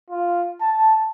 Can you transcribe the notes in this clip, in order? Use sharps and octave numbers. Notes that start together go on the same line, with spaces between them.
F4
A5